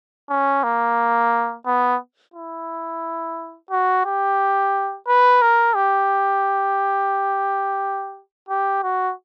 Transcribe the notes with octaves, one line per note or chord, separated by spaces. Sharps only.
C#4
A#3
B3
E4
F#4
G4
B4
A#4
G4
G4
F#4